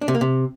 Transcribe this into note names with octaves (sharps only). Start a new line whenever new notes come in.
D4
C3
A#3
C3